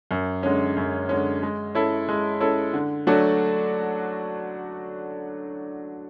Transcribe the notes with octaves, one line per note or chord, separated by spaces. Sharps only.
F#2
D3 G#3 C#4
F#2
D3 G#3 C#4
G#3
C#4 E4 A4
G#3
C#4 E4 A4
D3
F#3 A3 D4 F#4